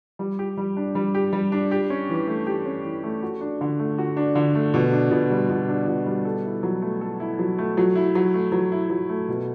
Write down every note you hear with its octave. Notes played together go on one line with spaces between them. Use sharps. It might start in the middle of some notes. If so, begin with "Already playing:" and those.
G3
G4
G3
D4
G3
G4
G3
D4
G4
C#4
E3
A3
G4
C#4
E3
A3
F#4
D4
D3
A3
F#4
D4
D3
A3
B2
D4
B2
G3
B2
D4
B2
G3
A4
E4
F#3
A3
A4
E4
F#3
A3
F#3
E4
F#3
A3
F#3
E4
F#3
A3
B2